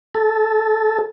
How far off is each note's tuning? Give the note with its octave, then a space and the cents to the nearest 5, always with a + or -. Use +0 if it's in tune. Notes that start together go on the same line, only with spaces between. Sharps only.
A4 -10